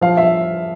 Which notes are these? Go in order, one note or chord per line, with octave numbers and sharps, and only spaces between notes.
F3 F5
E5